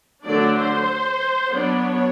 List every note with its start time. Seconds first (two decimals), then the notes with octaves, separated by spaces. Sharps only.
0.23 D3 F#3 A3 D4 D5
0.55 C5
1.49 F#3 B3 D4 C#5